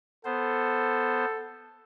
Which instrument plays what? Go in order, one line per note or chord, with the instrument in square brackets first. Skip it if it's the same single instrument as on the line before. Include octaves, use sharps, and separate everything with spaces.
[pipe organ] B3 C5 [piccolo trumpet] A4